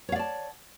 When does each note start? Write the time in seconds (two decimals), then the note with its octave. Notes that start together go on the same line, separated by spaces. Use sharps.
0.09 C#5
0.12 F5
0.16 D5
0.19 A5